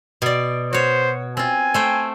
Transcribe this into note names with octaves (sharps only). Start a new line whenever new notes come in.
B2 D5
F#4 C5 C#5
C4 F4 G#5
A3 C5 G5